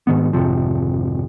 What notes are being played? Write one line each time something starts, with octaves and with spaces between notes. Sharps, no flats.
G#2 D#3 B3
G#1 F2 C3 F3